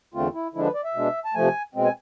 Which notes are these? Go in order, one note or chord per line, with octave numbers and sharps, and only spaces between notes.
E2 D3 A3 C4 F4
E4
D3 F3 G#3 D4 E4
B4
D5
E5
B2 G#3 D4
A5
C3 F3 A3 G#5
B2 G#3 C4
G#5